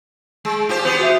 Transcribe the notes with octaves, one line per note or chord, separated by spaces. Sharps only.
G#3
F4 G4 C5
B3 F4 G4 C5
F#4 E5